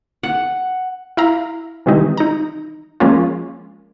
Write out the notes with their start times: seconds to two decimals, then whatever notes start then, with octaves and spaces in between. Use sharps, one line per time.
0.23 F#5
1.17 E4 F5 A#5
1.86 C3 D#3 E3 G3 G#3 D#4
2.17 D#4 A#5
3.00 F3 G#3 A#3 C#4 F4